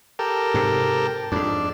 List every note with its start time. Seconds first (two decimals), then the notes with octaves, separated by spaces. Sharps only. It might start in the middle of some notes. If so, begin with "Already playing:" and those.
0.19 G4 A4 A#4
0.54 G#2 C3
1.32 F2 G#2 D4